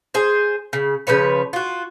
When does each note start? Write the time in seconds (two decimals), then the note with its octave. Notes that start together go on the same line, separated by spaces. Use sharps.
0.14 G#4 C5
0.73 C#3
1.07 C#3 F3 B4 C#5
1.53 F4 F#4